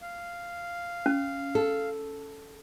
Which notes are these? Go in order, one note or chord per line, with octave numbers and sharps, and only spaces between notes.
F5
C#4
A4